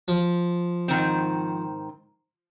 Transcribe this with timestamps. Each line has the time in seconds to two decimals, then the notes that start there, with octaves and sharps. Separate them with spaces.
0.08 F3
0.88 G#2 D#3 C4